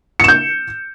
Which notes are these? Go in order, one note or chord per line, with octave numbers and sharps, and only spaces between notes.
G6 C#7 E7